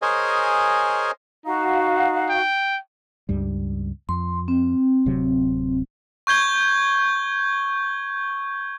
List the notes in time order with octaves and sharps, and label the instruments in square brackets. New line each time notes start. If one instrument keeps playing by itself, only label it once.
[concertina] G#4 A#4 C5 C#5 D#5 G#5
[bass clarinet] D#4 [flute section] F#4 F5
[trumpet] G5
[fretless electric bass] C#2 G2 G3
[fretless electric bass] F2 [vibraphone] C6
[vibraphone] C4
[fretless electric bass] D1 C3 F#3
[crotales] C#6 G6 G#6 G7